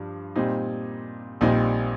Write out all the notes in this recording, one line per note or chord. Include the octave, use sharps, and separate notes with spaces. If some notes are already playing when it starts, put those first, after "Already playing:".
Already playing: G2 F3
A#2 G3 C4 D#4
A#1 A#2 G3 C4 D#4